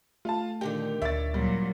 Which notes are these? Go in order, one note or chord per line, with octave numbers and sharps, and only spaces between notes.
A3 F4 F5 A5
A#2 D3 D#3 G4
D2 C#5 D5 E5 A6
A#2 F#3 G3